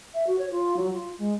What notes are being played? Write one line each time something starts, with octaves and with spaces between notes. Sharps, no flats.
E5
F#4
C#5
F4
F#3
F4
G#3